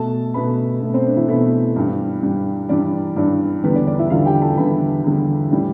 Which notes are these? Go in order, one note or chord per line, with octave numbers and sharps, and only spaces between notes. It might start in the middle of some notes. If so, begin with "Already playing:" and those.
Already playing: B2 A3 A4 A5
B2 A3 B4 B5
B2 A3
C4 C5
D4
E3 E4
B2 A3 B3 B4
G2 E3 G3
G2 E3 G3
G2 E3 G3 D4 D5
G2 E3 G3 D4 D5
E2 D3 G3 B3 B4
D4 D5
D4 D5
E4 E5
E2 D3 G3 F4 F5
G4 G5
A4 A5
E2 D3 G3 B4 B5
E2 D3 G3
A2 E3 G3